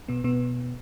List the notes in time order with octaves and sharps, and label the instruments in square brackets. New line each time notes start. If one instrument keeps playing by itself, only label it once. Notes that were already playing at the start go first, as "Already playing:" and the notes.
[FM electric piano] B2 B3
B2 B3